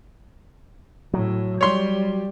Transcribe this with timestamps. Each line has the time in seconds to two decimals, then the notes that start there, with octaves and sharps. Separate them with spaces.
1.14 A2 F#3
1.61 G3 C#5 C6